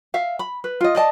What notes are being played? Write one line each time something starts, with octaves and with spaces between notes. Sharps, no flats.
E5 F5
B5
B4
F4 D#5
D5 D#5 A5